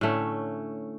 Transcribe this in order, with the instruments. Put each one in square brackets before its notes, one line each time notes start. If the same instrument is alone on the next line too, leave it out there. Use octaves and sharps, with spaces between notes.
[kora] A2 D3 A3 C#4